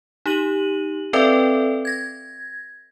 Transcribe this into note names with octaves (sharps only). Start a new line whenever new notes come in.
D#4 G4 D#7 F#7
C4 A4 B4 D5 E5 G5
G#6 A#6